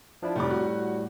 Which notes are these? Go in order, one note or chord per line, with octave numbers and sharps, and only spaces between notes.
F3 D4 E4
F1 A2 G3 D6
F#4